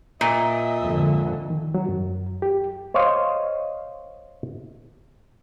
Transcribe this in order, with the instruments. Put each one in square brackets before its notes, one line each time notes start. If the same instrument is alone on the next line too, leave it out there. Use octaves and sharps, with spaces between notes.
[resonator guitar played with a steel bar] A#2 [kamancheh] D#5 E5
[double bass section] F2 G#2 D3
[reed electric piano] D#3
F#3
F#2
G4
[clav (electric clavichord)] C5 C#5 D#5 F5